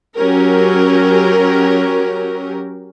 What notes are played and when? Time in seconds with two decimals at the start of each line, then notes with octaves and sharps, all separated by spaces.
0.16 F#3 C#4 G4 A#4